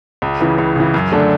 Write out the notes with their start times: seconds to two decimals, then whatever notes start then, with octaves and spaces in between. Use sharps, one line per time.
0.22 C#2
0.40 C#3 E3
0.58 C#2
0.76 C#3 E3
0.94 F#2
1.12 D3 A3 D4